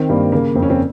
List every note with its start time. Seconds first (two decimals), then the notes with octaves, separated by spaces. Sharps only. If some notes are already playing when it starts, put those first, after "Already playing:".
Already playing: D#3 C4
0.09 G2 A#3
0.32 C#3 A#3
0.55 F2 C4
0.63 C#4
0.70 C4